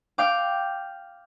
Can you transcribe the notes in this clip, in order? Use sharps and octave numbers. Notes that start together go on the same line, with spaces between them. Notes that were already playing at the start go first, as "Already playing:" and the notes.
F5 G5 D6